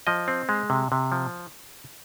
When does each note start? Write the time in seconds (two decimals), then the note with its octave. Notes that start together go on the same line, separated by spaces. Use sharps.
0.07 F3 D#5
0.28 C4
0.49 G#3
0.70 C3
0.92 C3
1.12 F3